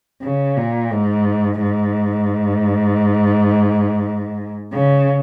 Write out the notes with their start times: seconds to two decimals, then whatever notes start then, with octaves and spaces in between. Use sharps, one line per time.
0.22 C#3
0.57 A#2
0.92 G#2
1.61 G#2
4.72 C#3